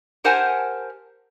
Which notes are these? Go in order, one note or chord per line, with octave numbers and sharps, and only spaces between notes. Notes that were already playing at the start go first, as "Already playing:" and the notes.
G4 A#4 C5 F#5 G#5 A5